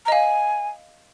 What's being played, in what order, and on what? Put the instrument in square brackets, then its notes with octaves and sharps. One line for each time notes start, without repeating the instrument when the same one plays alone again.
[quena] A#5
[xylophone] D#5
[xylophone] F5 [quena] G#5